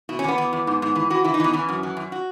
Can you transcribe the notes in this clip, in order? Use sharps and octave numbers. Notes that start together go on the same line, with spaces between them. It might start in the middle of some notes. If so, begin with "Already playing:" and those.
B2 E4
C#4
E2 B3
E2
E2
G#2
G#2
E3
E3 F#4
E3 E4
D#4
E3 B3
E3 C#4
F#2
E3
F#2
F#4